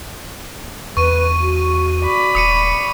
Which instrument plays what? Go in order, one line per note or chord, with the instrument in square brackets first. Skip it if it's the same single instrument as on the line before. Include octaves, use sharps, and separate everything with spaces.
[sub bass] E2 [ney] B4 [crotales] C#6 D#7
[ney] F#4
[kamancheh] D5 B5
[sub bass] D#1 [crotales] D#6 C#7 D#7